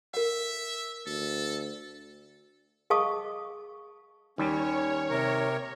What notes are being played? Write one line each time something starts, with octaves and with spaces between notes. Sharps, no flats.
A#4 E5 F#5
D2 A4
G#4 D#5 F5 A5 C#6 D#6
D#2 G3 C#4 C#5
C3 A#4